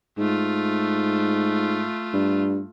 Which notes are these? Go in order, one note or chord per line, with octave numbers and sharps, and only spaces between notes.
G#2 A3 F4
G2